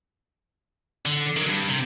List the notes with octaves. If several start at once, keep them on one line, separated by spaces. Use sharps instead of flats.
D3
D#3 F#3
G2
C3